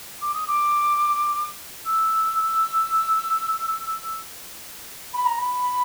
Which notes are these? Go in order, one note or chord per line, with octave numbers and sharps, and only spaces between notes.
D6
D#6
D6
E6
B5
A#5
B5